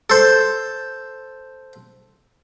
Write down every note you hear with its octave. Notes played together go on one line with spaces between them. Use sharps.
A4 C5